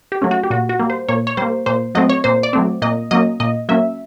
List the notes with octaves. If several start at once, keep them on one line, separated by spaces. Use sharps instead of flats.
G4
F#3 A3 C#4
F#4
G4
A#2 F#4
F#4
G3 A#3
C5
A#2 C#5
C#5
G3 A#3 C5
A#2 C5
F#3 A3 C4 D#5
C#5
A#2 C5
D5
F#3 A3 C4
A#2 D#5
F#3 A#3 C#4 D#5
A#2 D#5
F#3 A#3 C#4 E5